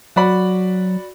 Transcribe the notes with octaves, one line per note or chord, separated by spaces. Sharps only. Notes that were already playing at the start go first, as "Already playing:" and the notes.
F#3 F#4 D5 B5